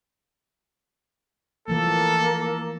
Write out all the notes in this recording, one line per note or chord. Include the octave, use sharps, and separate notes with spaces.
E3 F3 A3 A#3 A4